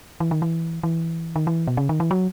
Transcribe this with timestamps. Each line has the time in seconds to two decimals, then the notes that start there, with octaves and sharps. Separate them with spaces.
0.20 E3
0.31 D#3
0.42 E3
0.83 E3
1.36 D#3
1.47 E3
1.67 B2
1.77 C#3
1.89 D#3
2.00 E3
2.11 F#3